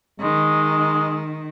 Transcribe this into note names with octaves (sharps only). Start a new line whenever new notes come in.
D#3 G#3